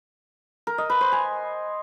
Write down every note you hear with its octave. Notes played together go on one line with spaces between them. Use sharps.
A#4
D#5
B4
C5
G#5